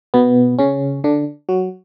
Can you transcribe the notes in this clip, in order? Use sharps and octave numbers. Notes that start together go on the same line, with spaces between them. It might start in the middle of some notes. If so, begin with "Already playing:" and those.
B2 B3
C#3 C#4
D3 D4
F#3 F#4